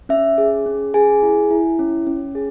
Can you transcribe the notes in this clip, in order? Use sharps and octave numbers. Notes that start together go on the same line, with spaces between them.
C#4 E5
G#4
C#4
G#4 G#5
E4
E4
C#4
C#4
G#4